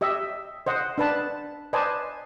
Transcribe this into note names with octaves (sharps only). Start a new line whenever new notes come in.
G4 D#5 E5
C5 D#5 F#5
D4 B4 A5
B4 C5 D5 D#5 G#5 A5